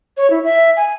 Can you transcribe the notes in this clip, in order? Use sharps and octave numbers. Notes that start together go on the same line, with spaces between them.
C#5
E4
E5
G#5